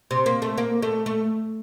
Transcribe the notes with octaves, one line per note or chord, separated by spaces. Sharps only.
C3
A#3
A3
A#3
A3
A3